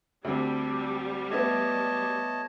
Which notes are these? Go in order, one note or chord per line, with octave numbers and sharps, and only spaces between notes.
D2 G3 C4 A4
A3 B3 C#5 D#5 A5